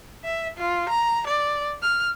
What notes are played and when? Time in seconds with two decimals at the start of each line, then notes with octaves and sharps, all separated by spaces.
0.24 E5
0.57 F4
0.89 A#5
1.27 D5
1.82 F6